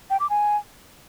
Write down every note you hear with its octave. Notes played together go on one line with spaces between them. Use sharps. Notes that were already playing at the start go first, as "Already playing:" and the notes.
G5
D6
G#5